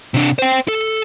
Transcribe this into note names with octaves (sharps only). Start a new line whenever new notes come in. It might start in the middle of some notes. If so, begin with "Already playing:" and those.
C3 D4
C5 G5
A4